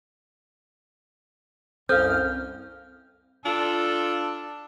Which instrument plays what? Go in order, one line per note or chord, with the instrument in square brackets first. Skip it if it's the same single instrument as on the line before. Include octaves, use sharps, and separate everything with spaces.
[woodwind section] C2 F#2 F6 [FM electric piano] C4 [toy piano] A4 F5 [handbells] G6
[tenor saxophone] D4 [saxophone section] F4 [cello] A4